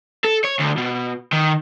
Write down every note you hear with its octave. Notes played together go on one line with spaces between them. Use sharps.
A4
C#5
D2
B2
D#3